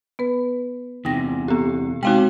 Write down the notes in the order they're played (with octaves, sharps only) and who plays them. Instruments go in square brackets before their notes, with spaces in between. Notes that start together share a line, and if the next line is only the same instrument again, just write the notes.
[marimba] B3 B4
[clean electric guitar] E2 C3 [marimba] D#4 G5 A#6
[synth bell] B3 G4
[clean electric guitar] C3 G4 [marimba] G#3 C4 F#4 [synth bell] D#4 F5 G5